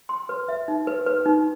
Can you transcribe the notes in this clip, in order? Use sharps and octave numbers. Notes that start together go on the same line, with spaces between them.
C6
B4
E5
D#4
B4
B4
D#4